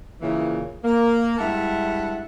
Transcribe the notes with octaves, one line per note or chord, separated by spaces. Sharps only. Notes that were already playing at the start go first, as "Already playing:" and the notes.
A#2 C#3 E3
A#3
G2 G#3 E4 E5 F#5 A5